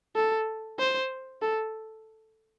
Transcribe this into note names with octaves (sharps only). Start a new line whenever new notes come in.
A4
C5
A4